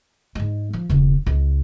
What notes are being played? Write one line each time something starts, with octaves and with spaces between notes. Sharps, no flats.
G#2 G#3
F3
E1 C#3
C#2